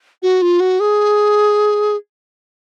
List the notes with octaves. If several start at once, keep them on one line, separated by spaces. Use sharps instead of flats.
F#4
F4
F#4
G#4